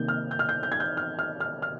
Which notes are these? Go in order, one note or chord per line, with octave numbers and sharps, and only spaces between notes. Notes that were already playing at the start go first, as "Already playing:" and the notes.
Already playing: C3 D#3 A#3 G6
F6
G6
F6
G6
G6
G#6
G6
F6
F6
F6
F6